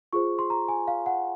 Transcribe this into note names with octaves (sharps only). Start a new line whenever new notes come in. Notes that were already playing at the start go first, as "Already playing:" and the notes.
F4 G#4 C5 C#6
C6
A#5
G#5
F5
F#5